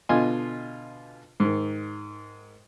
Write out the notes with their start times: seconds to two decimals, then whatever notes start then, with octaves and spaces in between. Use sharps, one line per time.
0.09 B2 D3 F4 D#5 G#5 C6
1.40 G#2 D#3